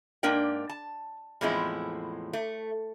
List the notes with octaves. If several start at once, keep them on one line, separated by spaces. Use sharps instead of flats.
G#2 A#3 D4 A#4 D5 G5
A5
E2 A2 F3 G#3 C4 E4
A3